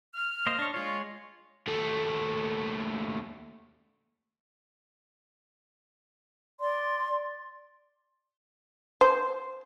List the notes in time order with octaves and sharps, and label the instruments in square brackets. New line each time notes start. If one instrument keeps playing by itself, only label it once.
[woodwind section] F6
[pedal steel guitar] A#3 C5 D#5
D4 C#5
[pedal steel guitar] G#3 C#5 [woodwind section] F4
[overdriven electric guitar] D#2 A3
[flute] D5 [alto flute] C6
[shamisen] C5